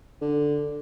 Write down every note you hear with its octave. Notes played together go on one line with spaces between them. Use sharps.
D3